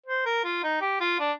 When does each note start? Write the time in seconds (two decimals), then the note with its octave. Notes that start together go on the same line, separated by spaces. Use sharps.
0.06 C5
0.26 A#4
0.44 F4
0.63 D#4
0.81 G4
1.01 F4
1.20 D4